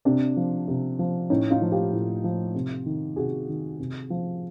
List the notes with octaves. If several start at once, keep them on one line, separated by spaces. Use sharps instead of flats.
C3 C4 D4
F3
C3
F3
A2 C#4 D#4
D#4 F4
F3
F4 G4
A2
F3
C3
D#3
C3 F#4 G#4
D#3
C3
F3